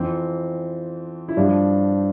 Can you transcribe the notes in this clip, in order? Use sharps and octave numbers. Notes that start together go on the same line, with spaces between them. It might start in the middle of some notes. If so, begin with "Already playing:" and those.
Already playing: F2 E3 C4
E4
G2 F3 D4